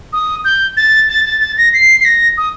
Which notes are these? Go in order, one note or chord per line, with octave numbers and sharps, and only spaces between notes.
D#6
G6
A6
A6
A6
A6
A#6
C7
C7
A#6
D#6